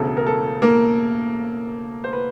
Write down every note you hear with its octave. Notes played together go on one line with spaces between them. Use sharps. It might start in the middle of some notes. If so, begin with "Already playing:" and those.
Already playing: E1 D2 C#3 A4
A#4
A4
A#3 A#4
C5
B4